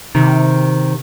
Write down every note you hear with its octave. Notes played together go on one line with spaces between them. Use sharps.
C3 D#3